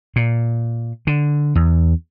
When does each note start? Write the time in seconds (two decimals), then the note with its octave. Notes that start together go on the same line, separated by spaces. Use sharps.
0.16 A#2
1.07 D3
1.55 E2